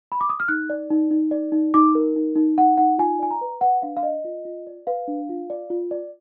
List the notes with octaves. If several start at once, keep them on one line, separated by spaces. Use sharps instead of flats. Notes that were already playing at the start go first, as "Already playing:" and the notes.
B5
D6
D#6
F6
D#4 F#6
D5
D#4
D#4
D5
D#4
D#4 D6
A#4
D#4
D#4
D#4 F#5
D#4 F#5
F4 G#5
D5 G#5
A#5
B4
B4 F#5
D4 F5
F5
D5 D#5
F4
F4
D5
B4 F5
D4
F4
D5
F4
D5